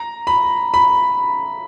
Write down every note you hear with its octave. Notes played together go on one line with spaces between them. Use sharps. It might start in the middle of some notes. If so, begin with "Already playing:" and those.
Already playing: A#5
B5
B5